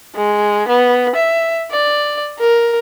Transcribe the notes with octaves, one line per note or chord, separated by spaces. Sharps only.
G#3
B3
E5
D5
A#4